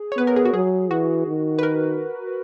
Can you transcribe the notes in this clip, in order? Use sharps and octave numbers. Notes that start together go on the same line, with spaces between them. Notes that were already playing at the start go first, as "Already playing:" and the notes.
Already playing: G#4
C#5
B3 B4
A#4
G#4
F#4
F#3 G#4
E3 F#4
D#3
B4
A#4